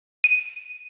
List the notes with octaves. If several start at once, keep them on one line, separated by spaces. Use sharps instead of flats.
D#7